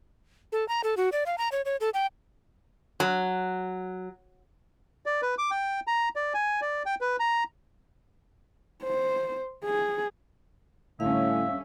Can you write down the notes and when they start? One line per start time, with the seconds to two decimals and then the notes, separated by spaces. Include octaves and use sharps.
0.52 A4
0.68 A#5
0.84 A4
0.97 F#4
1.12 D5
1.26 F5
1.38 A#5
1.52 C#5
1.65 C#5
1.81 A4
1.94 G5
3.00 F#3
5.06 D5
5.22 B4
5.38 D6
5.51 G5
5.87 A#5
6.16 D5
6.34 G#5
6.61 D5
6.86 G5
7.01 B4
7.20 A#5
8.84 C5
9.65 G#4
11.00 A2 D3 G3 C#4 E5 F5